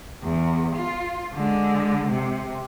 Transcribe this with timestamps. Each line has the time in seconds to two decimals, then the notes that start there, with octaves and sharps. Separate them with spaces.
0.24 E2
0.76 F4
1.34 D3 G#3
2.09 C3